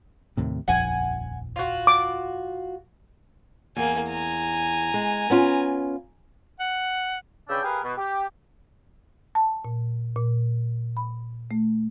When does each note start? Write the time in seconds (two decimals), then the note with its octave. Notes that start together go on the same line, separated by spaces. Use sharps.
0.37 D#2 A2 C3
0.68 D#1 A#1 F2 F#5 G#5
1.56 F4 F#4
1.87 D6
3.77 E2 A#3 G#5
4.10 G#5 A#5
4.94 G#3
5.30 B3 C#4 F4
6.60 F#5
7.49 C#3 D4 B4 G5 E6
7.64 G4 G#4 A#4 B4 F5
7.83 B2
7.98 G4
9.35 A5
9.65 A#2
10.16 A#2
10.97 B5
11.51 A3